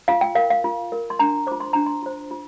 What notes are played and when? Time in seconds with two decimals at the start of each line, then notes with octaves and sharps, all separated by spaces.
0.08 F4 F5
0.21 G5
0.35 A#4 F5
0.50 F5
0.64 F4
0.92 A#4
1.10 C6
1.19 D4 A#5
1.47 F4 C5 D6
1.60 C6
1.73 D4 A#5
1.86 C6
2.03 F4 C5
2.31 F4